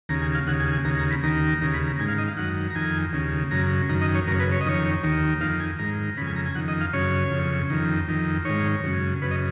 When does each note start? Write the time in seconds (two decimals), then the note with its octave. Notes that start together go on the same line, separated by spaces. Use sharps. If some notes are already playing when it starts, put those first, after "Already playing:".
0.09 D#2 C#3 A#5
0.22 G#5
0.35 F5
0.47 D#2 C#3 F#5
0.60 G#5
0.72 G#5
0.85 D#2 C#3 A#5
0.98 A#5
1.11 B5
1.23 D#2 D#3 A#5
1.61 D#2 C#3 A#5
1.74 B5
1.87 A#5
1.99 G#2 D#3 G#5
2.08 F5
2.18 D#5
2.28 F5
2.37 F#2 D#3 F#5
2.70 A#5
2.75 F2 D#3 G#5
3.13 D#2 C#3
3.51 F#2 C#3 A#5
3.89 F#2 D#3 A#5
4.02 D#5
4.15 C#5
4.27 F#2 A#4
4.31 C#3
4.40 B4
4.52 C#5
4.61 D#5
4.65 F2 D#3 C#5
5.03 D#2 D#3
5.41 F2 D#3 F5
5.60 G#5
5.79 G#2 D#3 A#5
6.17 C#3 B5
6.22 F2
6.27 G#5
6.36 A#5
6.46 G#5
6.55 F2 D#3 F#5
6.68 D#5
6.81 F5
6.93 F#2 C#3 C#5
7.31 F2 C#3
7.70 F2 D#3
8.08 F2 D#3
8.45 G#2 D#3 C#5
8.84 F#2 C#3
9.22 F#2 C#3 B4
9.31 D#5